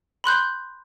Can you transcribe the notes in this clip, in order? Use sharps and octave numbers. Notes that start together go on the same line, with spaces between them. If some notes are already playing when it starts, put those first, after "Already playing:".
B5 C6 F#6 G6